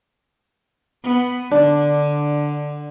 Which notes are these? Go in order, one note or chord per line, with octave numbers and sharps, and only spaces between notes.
B3
D3 D4